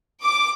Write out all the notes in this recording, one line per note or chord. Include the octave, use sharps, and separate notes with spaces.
D6